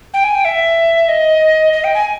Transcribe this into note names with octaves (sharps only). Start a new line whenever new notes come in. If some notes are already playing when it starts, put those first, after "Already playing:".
G5
G#5
G5
E5
D#5
D#5
G5
G#5